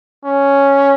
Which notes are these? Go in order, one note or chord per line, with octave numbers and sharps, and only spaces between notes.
C#4